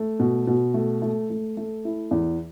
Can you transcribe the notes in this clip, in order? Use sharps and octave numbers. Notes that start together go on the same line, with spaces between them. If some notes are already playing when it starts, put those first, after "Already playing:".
Already playing: A3
B2
B2
A3
A3
A3
A3
E4
E2